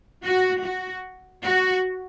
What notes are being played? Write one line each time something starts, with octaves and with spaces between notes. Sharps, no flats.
F#4
F#4
F#4